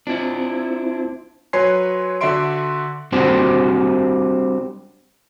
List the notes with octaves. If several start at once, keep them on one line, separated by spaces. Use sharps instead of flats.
C4 D4 E4 F4 C5
F#3 B4 C#5 G#5 C6 C7
D3 F#4 D5 E5 C6 D7
G3 C4 D4 F#4 C5